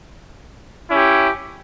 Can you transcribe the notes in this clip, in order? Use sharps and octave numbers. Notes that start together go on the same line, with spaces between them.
C#4 E4 G4